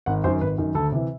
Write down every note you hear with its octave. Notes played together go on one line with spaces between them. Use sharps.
G#1 F#5
F#2 D#3 C5
G#1 B4
F#2 D#3
D2 A4
C3 E3